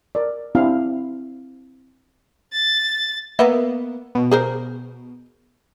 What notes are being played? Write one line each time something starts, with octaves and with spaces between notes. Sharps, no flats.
A#4 D5
C4 D4 E4 G4 F5
A6
A#3 B3 D#5 E5 F#5
B2
G#4 A#4 C5